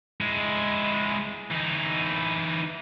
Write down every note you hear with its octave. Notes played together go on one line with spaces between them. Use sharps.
G#3 E4
E3 D#4